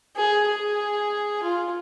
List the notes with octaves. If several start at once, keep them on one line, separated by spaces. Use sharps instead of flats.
G#4
G#4
F4